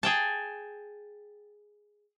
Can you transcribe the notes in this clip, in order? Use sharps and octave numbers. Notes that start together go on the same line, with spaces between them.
G#4 G5 A5